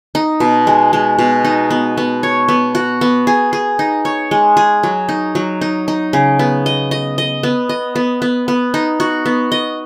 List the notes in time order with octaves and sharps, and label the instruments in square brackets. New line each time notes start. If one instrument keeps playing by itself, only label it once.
[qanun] D#4
B2
G#3
G#3
B2
D#4
B3
B3
C#5
B3
F#4
B3
G#4
G#4
D#4
C#5
G#3
G#4
F#3
D#4
F#3
D#4
D#4
C#3
B3
D#5
D#5
D#5
B3
D#5
B3
B3
B3
D#4
F#4
B3
D#5